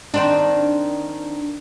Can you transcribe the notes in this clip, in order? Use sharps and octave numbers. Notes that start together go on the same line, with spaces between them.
D#3 C4 D4